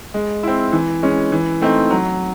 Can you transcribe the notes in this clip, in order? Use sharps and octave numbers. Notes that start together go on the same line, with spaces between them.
G#3
C4 E4
E3
G#3 C#4
E3
A3 C4 D#4
F#3